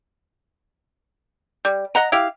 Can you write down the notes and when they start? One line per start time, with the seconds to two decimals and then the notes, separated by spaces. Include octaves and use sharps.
1.65 G3
1.95 D#5 F#5 A#5
2.12 E4 G4 F5